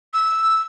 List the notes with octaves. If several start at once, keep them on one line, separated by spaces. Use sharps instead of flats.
E6